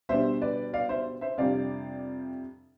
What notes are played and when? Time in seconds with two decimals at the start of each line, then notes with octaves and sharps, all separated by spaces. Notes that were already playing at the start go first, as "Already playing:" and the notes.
0.09 B2 G3 D4 C5 E5
0.41 B4 D5
0.73 D5 F5
0.89 C5 E5
1.21 C5 E5
1.37 F2 C3 G3 D4 D5 F5